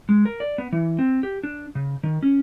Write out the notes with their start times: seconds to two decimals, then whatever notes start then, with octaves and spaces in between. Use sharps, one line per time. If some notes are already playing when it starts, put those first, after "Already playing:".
0.09 G#3
0.25 A#4
0.40 D5
0.58 B3
0.73 E3
0.99 C4
1.23 G4
1.43 D4
1.75 C#3
2.03 D#3
2.23 C#4